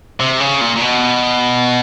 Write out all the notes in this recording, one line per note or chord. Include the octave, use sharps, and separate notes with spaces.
C3
C#3
A#2
A#2
B2